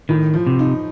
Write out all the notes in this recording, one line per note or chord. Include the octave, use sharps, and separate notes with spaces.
A2 D#3
F3
C3
D#4